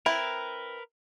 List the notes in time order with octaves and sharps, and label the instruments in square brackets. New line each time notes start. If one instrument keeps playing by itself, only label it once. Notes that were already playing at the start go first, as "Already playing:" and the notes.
[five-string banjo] C4 E4 [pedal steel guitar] A#4 B4